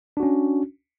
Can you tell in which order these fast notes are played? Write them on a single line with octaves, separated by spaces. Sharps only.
D4 F#4 C#4